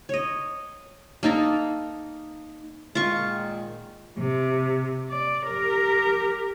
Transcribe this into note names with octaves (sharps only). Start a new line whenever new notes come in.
C#5 D#5
A#3 D#4 A4 A#4
A#2 D#3 G#3 F4 C#6
C3
D5
G4 A#4